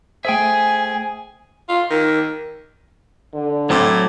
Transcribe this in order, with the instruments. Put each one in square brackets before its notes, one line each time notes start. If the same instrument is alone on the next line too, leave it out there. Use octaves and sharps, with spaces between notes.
[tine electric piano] A3 C5 [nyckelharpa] G#4 [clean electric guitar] E5 G5 [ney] G#5
[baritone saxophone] F4
D#3
[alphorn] D3
[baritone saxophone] A2 [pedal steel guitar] F#3 A5 D6 [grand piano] C4